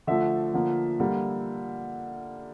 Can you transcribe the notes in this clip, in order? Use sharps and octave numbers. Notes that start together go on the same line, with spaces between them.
D3 F3 A3 E5
D3 F3 A#3
D3 G3 A#3